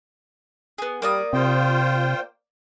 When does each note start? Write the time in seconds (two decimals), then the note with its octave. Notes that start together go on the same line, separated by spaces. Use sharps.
0.78 B3 G#4
1.02 G3 A#3 D5 D#6
1.33 C3 F4 C5 G5